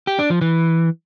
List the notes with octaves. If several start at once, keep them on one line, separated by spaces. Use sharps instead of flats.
G4
D4
F3
E3